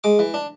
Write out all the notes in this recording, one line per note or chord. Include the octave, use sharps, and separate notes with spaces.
G#3 D6
E3
D4